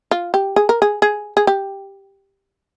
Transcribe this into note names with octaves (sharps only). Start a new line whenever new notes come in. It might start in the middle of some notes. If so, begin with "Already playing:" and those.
F4
G4
G#4
A#4
G#4
G#4
G#4
G4